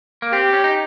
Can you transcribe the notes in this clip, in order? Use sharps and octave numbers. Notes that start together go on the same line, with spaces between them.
A#3
C4 G4
C#4
D#4